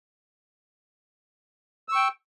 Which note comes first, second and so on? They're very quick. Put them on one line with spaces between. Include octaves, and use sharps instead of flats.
E6 C#6 G5